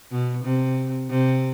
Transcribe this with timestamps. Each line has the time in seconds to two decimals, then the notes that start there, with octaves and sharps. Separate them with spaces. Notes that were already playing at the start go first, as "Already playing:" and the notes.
0.11 B2
0.44 C3
1.10 C3